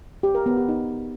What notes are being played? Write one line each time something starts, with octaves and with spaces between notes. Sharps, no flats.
G4
A#4
B3
G4
D#4